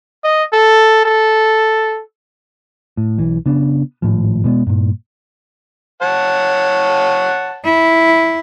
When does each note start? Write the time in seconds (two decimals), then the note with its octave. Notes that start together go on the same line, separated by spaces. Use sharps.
0.24 D#5
0.53 A4
1.05 A4
2.97 A2
3.18 B1 E3
3.46 C#3 B3 D4
4.02 G#1 A2 F3
4.44 B2 G#3 A#3 B3
4.67 G2 A#2
6.02 C#5 F#5 A5
7.65 E4